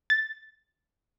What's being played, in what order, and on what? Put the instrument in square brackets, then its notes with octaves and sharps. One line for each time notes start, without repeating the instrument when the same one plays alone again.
[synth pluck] A6